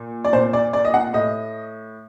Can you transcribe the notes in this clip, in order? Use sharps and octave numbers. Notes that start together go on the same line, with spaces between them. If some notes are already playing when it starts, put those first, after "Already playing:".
Already playing: A#2
D5
A#2 C5
D5
D5
D#5
F#5
A2 D#5